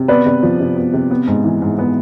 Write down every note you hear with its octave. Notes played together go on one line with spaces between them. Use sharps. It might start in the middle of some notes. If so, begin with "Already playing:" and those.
Already playing: C3
B3 B4 D5
C3
F3
C3
B3
C3
B3
G#2
E3
G#2
B3